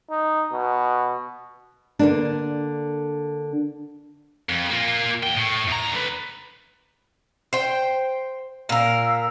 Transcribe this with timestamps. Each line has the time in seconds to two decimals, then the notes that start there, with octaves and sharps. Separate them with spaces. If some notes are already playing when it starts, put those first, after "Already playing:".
0.10 D#4
0.52 B2
1.99 D3 A#3 D4
4.49 F2
4.70 A#3 F4
5.23 E2 G5
5.36 A2
5.68 E2 A#5
5.92 D3 B4
7.53 C5 G5
8.69 A#2 A#4 F5 E6